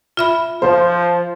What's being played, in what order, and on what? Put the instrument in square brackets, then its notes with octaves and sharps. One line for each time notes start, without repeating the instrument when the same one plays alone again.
[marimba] F4 E5 B5
[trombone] F3 [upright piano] C5